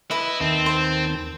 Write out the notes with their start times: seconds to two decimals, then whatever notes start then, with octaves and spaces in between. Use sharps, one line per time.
0.11 E4 B4 D#5
0.41 D#2 D#3 C4 A5
0.66 C5